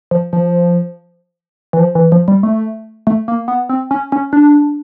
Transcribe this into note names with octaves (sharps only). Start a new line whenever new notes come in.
F3
F3
E3
F3
E3
F3
G3
A3
A3
A#3
B3
C4
C#4
C#4
D4